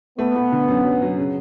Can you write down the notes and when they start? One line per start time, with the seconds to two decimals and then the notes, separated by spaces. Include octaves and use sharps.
0.19 A3 B3
0.36 A3
0.52 D3
0.68 F#2
0.85 F#3
1.02 F#3
1.18 C#3